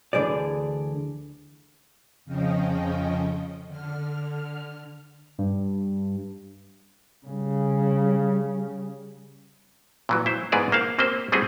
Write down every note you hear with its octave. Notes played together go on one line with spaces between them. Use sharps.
D2 D3 E3 A3 G#4 D5
F2 C#3 F3 C#4 D#5 G5
D3 F6
G2
C#3 G3
A#2 E3 F#3
E4 C5
G#2 E3 B3 G#4 D5 A#5
A#3 C5 F5 F#5
A#3 C4 G4 C5
G3 A3 C4 E4 F#4 G#4